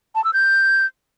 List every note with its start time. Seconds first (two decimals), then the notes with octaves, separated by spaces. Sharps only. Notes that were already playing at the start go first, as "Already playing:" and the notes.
0.15 A5
0.24 E6
0.33 G6